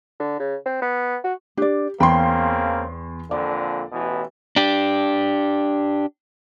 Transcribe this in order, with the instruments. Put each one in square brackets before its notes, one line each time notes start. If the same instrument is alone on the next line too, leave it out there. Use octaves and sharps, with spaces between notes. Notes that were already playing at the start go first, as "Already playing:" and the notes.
[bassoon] D3
C#3
C4
B3
F#4
[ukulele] D4 D5 [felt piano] G4
[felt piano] E2 C6 [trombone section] C#3 A#3 C4 [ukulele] G5 B5
[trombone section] F2 A#2 D3 [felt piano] D5
[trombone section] A1 B2 E3
[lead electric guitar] D4 G4